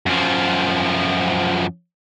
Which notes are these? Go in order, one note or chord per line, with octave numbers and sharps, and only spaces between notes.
F#2 F3